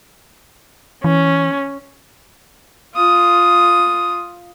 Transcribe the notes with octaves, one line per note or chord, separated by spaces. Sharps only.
E3 C#4
F4 D#6